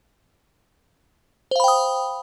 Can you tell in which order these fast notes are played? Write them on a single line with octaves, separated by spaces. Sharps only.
C5 F5 B5 G5 D#6